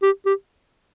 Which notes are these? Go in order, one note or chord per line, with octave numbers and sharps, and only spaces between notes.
G4
G4